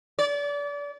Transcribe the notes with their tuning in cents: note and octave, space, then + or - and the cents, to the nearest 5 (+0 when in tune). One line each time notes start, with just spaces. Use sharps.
D5 -30